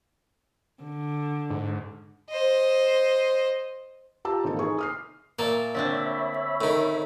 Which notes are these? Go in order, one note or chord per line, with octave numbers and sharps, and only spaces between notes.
D3
G#2
C5 D#5
F4 G4 A5 A#5 E6
G#1 E3 A#3 D#4 A4
D#4 G#4 C#6
D#6 F6 C7
A#2 A3 A#3 A5
D3 C4 D4 C#5 E5 B5
A2 D#3